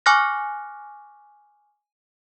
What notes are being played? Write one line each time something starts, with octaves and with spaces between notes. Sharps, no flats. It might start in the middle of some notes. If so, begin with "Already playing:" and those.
G#5 C#6 D6 F6 F#6 A#6